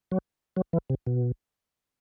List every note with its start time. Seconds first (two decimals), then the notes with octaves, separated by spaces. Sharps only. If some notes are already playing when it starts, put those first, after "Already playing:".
0.12 F#3
0.57 F#3
0.73 E3
0.90 C3
1.07 B2